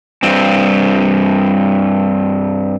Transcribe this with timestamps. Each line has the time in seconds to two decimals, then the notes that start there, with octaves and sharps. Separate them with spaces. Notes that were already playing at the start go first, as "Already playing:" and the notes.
0.23 G2 C4